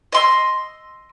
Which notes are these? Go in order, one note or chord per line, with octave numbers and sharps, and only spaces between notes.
D#5 C6 E6